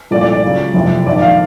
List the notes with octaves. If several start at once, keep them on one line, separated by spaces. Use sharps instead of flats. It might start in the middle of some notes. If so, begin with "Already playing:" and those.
C2 A#2 F3 A3 D5
D5
D5
C#2 C#3 F#3
F#1 F2 C3
A#1 G#2 D#3 D5
F5